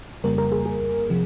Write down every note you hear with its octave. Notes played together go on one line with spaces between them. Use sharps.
F2 C#3 G3 A#3 A#4
A#4
G#4
G#4
C3 F3